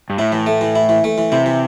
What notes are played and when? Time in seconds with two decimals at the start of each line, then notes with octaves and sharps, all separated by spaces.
0.10 G2
0.18 A2 E4
0.32 E3
0.47 A3
0.61 E3
0.75 E4
0.89 E3
1.04 A3
1.18 E3
1.32 C3 E4
1.46 E3